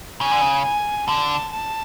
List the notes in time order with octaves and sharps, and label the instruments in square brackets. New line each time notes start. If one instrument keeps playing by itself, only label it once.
[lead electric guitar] C#3 [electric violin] G#5
[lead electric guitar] D3
C#3
[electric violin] G#5
[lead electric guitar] D3 [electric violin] A5
[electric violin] A5